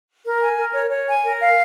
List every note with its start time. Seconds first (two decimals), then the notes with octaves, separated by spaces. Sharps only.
0.24 A#4
0.41 G#5
0.57 A#4
0.73 C#5
0.90 C#5
1.07 G#5
1.24 A#4
1.41 F5